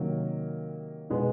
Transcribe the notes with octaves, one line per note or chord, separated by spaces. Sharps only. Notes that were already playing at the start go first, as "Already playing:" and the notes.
Already playing: C3 D#3 F#3 A#3
B2 G#3 B3 D#4